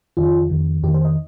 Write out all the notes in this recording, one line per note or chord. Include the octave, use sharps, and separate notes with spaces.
F2 D#3 F4
F2 D#3
F2 D#3 G4
C5
D#5